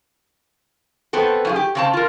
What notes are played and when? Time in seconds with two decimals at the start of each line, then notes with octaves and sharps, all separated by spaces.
1.13 B3 C4 A4
1.45 F#2 F4 G#4
1.56 G4
1.75 C#3 C4 A5
1.93 F4 A#4